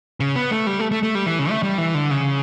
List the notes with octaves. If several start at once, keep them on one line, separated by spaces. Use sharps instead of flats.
C#3
B3
A3
G3
A3
A3
A3
G3
E3
C#3
A3
G3
E3
D3
C#3